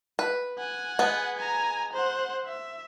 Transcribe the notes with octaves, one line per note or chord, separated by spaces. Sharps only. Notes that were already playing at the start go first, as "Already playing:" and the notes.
B4
F#5 G#5
G#3 B3
G#5 A#5
C5 F#5
E5